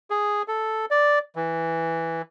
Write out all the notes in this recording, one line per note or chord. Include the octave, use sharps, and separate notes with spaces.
G#4
A4
D5
E3